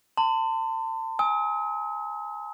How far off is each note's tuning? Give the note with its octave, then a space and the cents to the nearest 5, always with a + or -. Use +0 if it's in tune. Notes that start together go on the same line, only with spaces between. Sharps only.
A5 +35 C6 -30
G#5 +0 D#6 +45